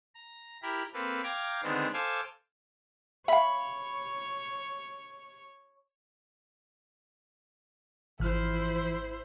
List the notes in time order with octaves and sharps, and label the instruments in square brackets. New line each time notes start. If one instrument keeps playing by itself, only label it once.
[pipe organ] A#5
E4 G4 A#4 B5
A#3 C4 A4 B4
F5 G5 A#5 D6 G#6
D3 D#3 G#3 B3 C4 D4
A4 C5 F5 G#5 D6 E6
[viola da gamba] C#5 [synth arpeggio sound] E5 F5 [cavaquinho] B5
[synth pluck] G#1 F6 [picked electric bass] E3 F3 [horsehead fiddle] E4 C5